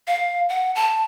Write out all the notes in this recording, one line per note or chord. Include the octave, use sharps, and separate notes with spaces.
F5
F#5
A5